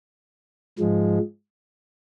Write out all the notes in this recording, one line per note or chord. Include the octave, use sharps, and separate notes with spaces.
G#2 F3 G#3